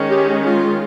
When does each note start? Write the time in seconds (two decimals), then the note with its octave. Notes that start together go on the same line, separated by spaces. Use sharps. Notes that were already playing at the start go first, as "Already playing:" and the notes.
Already playing: D#3 G#3 C#4
0.09 G4
0.44 F4